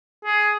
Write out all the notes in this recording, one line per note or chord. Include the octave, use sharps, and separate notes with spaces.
G#4